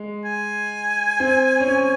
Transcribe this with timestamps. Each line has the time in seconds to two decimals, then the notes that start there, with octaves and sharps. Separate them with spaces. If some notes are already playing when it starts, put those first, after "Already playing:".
Already playing: G#3
0.25 G#5
1.20 C4
1.60 C#4
1.67 C4